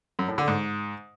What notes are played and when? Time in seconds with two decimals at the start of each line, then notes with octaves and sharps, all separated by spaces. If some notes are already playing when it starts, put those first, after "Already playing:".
0.19 F#2
0.28 A2
0.38 D3
0.48 G#2